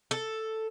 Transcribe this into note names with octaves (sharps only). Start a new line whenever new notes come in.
A4